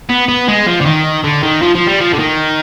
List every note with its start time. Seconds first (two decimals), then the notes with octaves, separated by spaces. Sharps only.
0.10 B3
0.28 B3
0.48 G#3
0.66 F3
0.80 D3
0.86 D#3
1.24 D3
1.43 D#3
1.62 F3
1.75 F3
1.87 G3
2.01 F3
2.13 D3
2.19 D#3